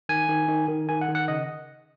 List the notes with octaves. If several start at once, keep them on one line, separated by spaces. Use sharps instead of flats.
D#3 G#5
D#3
D#3
D#3
D#3 G#5
F#5
D#3
F#5
C#3 D#5